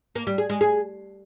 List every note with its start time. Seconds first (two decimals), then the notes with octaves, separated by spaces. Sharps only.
0.15 A#3
0.27 G3
0.38 G#4
0.49 G#3
0.61 G#4